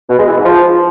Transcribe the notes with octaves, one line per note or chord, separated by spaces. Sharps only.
B2
G#3
E3
G#2
F3